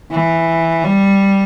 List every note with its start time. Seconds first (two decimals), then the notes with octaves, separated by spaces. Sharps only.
0.12 E3
0.84 G3